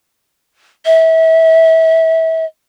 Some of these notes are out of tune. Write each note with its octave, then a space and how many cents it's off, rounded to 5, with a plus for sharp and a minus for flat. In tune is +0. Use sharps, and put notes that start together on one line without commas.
E5 -25